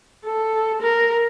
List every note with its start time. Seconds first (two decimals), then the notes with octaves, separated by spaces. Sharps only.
0.25 A4
0.82 A#4